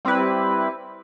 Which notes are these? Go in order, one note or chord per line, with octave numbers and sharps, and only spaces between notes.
G3 C4 E4 B4